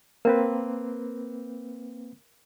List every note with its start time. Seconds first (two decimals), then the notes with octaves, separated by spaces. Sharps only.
0.25 A#3 C4 A#4 B4